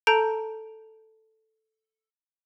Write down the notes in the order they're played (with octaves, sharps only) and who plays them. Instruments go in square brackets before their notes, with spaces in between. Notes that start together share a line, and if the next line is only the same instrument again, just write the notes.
[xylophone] A4 A5 A#5 G6 D7